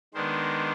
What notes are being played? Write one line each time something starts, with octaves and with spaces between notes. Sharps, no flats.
D#3 G#3 B3 D4 C5